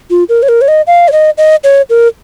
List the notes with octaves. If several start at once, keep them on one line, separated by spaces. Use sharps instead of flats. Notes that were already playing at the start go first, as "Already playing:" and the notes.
F4
A#4
C#5
A#4
C#5
D#5
F5
C#5
D#5
D#5
C#5
A#4